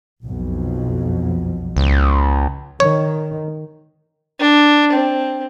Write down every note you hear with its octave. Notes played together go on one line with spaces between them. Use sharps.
B1 F2
C#2
D#3 C#5
D4
C4